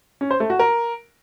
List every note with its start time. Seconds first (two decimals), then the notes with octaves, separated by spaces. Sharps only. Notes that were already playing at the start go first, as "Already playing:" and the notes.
0.21 C#4
0.31 C5
0.40 A3
0.50 F#4
0.59 A#4